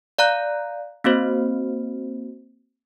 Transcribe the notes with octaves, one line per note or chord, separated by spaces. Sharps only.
D5 F5 A#5 F#6
A#3 C4 F#4 C5